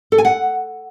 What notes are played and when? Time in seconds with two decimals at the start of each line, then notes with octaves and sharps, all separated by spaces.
0.12 A4
0.18 G#5
0.25 F#5